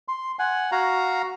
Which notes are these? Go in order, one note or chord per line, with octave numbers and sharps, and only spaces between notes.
C6
F#5 G#5
F#4 F5 A#5